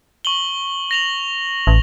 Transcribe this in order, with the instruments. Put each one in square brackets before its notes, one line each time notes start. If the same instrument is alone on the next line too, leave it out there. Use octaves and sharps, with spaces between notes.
[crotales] C#6 F#7 G7
A#6 F7 F#7
[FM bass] A1